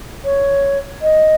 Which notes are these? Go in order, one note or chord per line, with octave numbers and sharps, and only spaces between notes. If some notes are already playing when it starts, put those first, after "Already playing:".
C#5
D#5